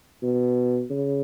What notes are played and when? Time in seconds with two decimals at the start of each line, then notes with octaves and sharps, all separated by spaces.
0.22 B2
0.90 C#3